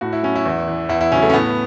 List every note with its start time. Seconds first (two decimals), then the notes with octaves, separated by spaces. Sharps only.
0.01 A2 F#4
0.13 E4
0.23 F#3 C#4
0.36 E4
0.45 E2
0.68 E3
0.89 E2 E4
1.01 E4
1.12 C#3 F#3 C#4
1.23 A3
1.30 C#4
1.33 A2 B3